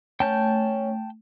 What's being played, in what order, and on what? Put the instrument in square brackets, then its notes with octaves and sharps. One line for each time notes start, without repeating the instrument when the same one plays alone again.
[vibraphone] A3 [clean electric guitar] C#4 [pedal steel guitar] G5 A5 G6